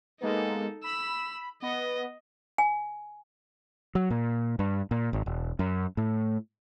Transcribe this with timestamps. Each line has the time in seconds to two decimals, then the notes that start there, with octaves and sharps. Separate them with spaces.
0.21 G#3 A#3 B3 D#4 A4
0.84 B5 E6
1.62 B3 D#5
2.58 G#5
3.95 F#3
4.10 A#2
4.59 G2
4.91 A#2
5.13 G#1
5.26 E1
5.59 F#2
5.97 A2